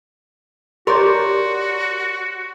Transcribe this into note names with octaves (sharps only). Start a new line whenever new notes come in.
F#4 G4 A#4 C#5 D5 C6